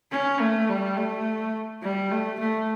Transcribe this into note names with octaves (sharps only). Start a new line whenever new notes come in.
C#4
A3
G3
A3
G3
A3
A3